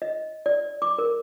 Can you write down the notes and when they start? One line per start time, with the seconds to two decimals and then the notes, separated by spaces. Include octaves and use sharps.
0.02 D#5
0.46 D5
0.82 D6
0.98 A#4